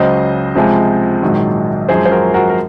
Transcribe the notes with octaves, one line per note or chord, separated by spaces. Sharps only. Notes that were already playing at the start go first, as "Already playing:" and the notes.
Already playing: C#2 C#3 F#3 C5 D#5
C#2 C3 F3 G#3
A#1 G#2 D#3 F#3
F#2 F3 G#3 G#4 C5
C5
F#4 A#4
F#4 A#4
A#4